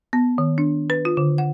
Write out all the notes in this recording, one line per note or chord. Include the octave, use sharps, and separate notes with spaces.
B3
D#3
D4
B4
F4
D3
F#5